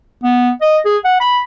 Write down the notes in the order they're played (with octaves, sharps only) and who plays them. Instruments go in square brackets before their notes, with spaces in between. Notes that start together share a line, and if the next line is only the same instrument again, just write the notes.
[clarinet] B3
D#5
G#4
F#5
B5